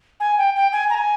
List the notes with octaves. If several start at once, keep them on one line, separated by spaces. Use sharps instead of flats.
G#5
G5
G5
G#5
A#5
G#5